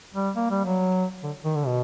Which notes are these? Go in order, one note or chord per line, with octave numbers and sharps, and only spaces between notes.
G3
A#3
G3
F#3
D3
D#3
D3
B2